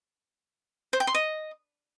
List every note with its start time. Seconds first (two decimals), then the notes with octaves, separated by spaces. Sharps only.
0.93 C5
1.00 G5
1.07 C6
1.15 D#5